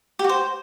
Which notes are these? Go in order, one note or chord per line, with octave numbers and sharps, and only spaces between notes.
G4
F#4
C5